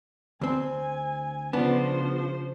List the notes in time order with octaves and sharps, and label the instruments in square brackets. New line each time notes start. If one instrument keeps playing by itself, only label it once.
[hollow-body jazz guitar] D2 C4 [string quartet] G#5
[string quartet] C#3 F3 C5 [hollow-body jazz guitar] B3 D4